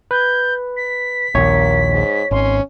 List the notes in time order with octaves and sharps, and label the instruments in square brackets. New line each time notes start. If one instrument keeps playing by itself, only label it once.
[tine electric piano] B4 [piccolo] G6
[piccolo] B6
[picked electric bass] A#1 D#2 [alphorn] A#3 [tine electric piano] C#5
[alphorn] G#2
[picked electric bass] G#1 [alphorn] C#4 [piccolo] C6